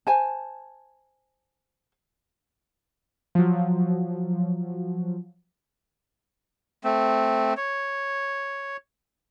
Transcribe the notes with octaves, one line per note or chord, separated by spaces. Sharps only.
C5 G#5 A5
F3 F#3
A3 C4
C#5